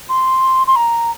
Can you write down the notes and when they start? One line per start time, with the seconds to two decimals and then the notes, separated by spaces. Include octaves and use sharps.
0.09 C6
0.67 C6
0.76 A#5